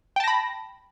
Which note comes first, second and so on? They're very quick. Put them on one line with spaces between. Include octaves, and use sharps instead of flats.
G5 A5 A#6 B5